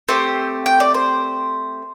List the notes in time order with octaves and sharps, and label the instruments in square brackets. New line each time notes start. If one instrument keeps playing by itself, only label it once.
[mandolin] A3 C4 G4 C5
G5
D5
C5